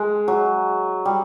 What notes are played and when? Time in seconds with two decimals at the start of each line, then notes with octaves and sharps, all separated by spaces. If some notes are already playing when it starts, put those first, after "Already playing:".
Already playing: G#3
0.28 F#3
1.05 G3